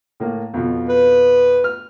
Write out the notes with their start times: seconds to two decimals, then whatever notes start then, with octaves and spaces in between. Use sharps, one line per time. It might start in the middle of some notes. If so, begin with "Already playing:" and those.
0.20 A2 A#3
0.54 F2 B2
0.89 B4
1.64 F6